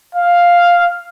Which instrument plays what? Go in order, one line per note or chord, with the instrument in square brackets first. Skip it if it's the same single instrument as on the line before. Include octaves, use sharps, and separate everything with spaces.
[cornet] F5